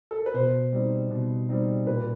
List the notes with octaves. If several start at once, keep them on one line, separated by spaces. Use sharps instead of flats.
A4
A#4
B4
B2 C5
G3 C4 D#4
B2
G3 C4 D#4
A#2 B4